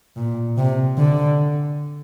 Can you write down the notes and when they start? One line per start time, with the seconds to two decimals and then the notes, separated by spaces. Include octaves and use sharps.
0.16 A#2
0.58 C3
0.98 D3